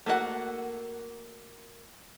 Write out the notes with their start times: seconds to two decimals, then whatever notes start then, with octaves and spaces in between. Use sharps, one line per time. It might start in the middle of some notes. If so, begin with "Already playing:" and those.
0.06 A3 A#3 F#4 A4 F#5